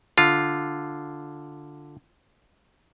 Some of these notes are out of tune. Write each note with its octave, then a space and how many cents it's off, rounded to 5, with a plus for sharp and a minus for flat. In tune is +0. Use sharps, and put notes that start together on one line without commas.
D3 +0 F4 +0